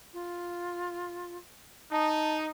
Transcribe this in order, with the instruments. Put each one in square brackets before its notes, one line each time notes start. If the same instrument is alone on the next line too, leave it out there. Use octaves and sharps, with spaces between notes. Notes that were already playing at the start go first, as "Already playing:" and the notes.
[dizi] F4
[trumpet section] D#4 [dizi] A5